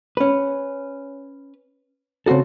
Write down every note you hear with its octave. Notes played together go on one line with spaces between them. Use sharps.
C#4 B4
C#3 C4 F4 F#4 A4